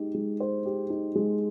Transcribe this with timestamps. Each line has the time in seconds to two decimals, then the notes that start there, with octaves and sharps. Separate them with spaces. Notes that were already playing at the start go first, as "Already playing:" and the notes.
Already playing: G#3 D#4 G4
0.14 G#3
0.40 C5
0.66 G4
0.90 D#4
1.15 G#3